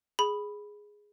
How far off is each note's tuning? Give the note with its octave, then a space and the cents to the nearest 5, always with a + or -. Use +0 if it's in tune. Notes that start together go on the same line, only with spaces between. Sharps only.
G#4 +0 B5 +0